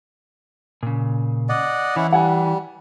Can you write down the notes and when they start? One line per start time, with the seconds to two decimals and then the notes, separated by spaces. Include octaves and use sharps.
0.83 A#2 C#3
1.49 D5 D#5 F#5
1.96 E3 C#4 E4 F#5
2.12 G3 F#5 G#5